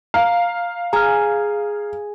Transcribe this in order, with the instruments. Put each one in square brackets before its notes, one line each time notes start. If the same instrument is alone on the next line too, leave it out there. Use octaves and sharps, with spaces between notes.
[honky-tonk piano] F5 [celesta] A#5
[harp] G#4 [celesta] A#5 F6